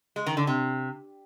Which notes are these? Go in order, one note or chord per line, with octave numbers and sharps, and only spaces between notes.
G#3
D#3
D3
C3